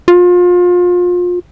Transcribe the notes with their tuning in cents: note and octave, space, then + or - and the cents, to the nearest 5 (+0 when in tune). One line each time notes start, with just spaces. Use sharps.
F4 +30